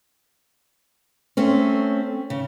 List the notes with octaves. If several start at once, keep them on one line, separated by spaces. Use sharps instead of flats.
A3 C4 C#4
C#3